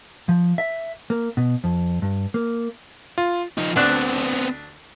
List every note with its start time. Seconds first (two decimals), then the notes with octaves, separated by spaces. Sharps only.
0.29 F3
0.58 E5
1.10 A#3
1.37 B2
1.64 F2
2.02 G2
2.34 A#3
3.18 F4
3.58 F3 D#4
3.76 D2 B3 C4 D4 F#6